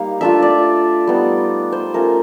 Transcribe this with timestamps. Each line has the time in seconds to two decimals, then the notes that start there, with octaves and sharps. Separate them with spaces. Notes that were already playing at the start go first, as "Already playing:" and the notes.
Already playing: G3 A#3 D#4 F5
0.21 A3 D4 F4 E5
0.42 D5
1.07 G3 B3 D#4
1.72 C5
1.94 A3 C#4 F4 A#4